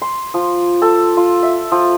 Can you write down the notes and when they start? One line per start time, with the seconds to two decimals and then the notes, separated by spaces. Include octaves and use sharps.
0.01 C6
0.34 F3
0.82 A4
1.17 F4
1.43 E5
1.72 F3